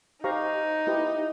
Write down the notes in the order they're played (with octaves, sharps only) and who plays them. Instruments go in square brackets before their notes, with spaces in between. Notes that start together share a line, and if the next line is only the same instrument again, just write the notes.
[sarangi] D#4 [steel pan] G4 C5 F5 A#5 C#6
[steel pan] E4 G4 B4